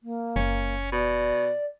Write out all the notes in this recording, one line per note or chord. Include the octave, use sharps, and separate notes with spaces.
A#3
F#1 C#4
B2 D5